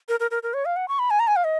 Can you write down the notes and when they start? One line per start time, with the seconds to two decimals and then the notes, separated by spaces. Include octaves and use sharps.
0.09 A#4
0.20 A#4
0.31 A#4
0.43 A#4
0.54 C#5
0.65 F5
0.76 F#5
0.88 C#6
0.99 B5
1.10 G#5
1.20 A#5
1.27 G#5
1.36 F5
1.44 D#5